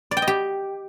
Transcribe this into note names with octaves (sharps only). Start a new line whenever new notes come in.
D5
G5
D#5
G4